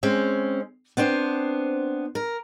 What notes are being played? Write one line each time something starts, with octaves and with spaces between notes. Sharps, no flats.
G#3 C4 C#4
B3 C4 D4 C5
A#4